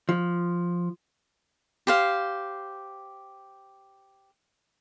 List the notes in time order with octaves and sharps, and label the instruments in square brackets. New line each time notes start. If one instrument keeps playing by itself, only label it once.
[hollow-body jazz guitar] F3
[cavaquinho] G4 C5 F5